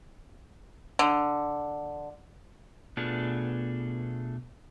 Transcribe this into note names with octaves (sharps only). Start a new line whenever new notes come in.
D3
B2 A3 B3 D4 F4 G#4